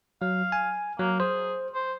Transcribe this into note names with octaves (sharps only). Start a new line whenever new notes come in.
F#3 F5
G#5
F#3 A#3
G#4 C5
C5